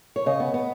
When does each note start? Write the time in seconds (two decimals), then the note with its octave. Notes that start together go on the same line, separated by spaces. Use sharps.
0.16 C#5
0.26 C#3 D#5
0.40 B3
0.54 B3